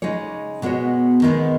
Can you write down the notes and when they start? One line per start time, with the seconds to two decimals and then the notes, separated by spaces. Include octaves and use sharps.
0.02 C#3 G#3 D#4 G#4 C#5
0.62 B2 G#3 B3 F#4 C#5
1.22 D#3 G#3 B3 D#4 G#4